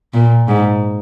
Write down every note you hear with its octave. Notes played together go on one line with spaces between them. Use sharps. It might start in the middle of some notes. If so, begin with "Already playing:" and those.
A#2
G#2